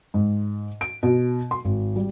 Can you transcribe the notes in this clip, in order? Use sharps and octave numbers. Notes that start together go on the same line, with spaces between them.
G#2
D7
B2
C6
G#1
G3